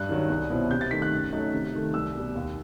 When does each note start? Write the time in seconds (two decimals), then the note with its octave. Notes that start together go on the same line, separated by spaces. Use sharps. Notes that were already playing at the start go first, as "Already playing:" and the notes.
Already playing: G2 F#6
0.09 D#3 F#3
0.29 C2
0.50 B2 F#3 C4 E4
0.71 C3 G6
0.81 A6
0.91 D#3 A3 B6
1.02 F#6
1.12 F#2
1.33 F#3 A3 D#4
1.53 C3
1.74 D#3 A3
1.94 C2 E6
2.15 B2 G3
2.36 D#2